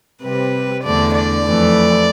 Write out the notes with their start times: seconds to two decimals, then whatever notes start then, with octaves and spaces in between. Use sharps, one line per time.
0.22 C3 G3 C4 B4
0.83 E2 D3 A3 D4 D5
1.14 D5
1.44 F2 E3 A3